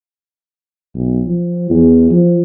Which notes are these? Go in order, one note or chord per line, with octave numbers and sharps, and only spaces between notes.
B1
F3
E2
F3